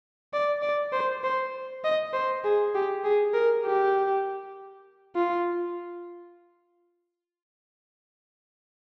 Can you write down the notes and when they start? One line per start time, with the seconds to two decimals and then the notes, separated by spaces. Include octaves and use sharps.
0.34 D5
0.62 D5
0.93 C5
1.24 C5
1.84 D#5
2.14 C5
2.45 G#4
2.75 G4
3.04 G#4
3.34 A#4
3.65 G4
5.16 F4